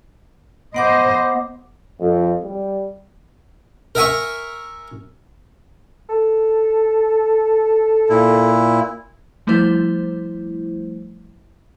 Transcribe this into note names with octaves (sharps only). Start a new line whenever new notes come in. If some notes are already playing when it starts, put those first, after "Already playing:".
B3 C5 D#5 F#5 D6
F2
G3
A#4 E5 G#5 C#6
A4
A#2 E4
F3 G3 A3 E4 C5